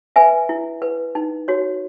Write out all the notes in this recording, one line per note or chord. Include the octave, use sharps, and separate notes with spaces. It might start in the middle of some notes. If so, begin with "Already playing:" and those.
B4 E5 G#5
E4
B4
D#4
F#4 C#5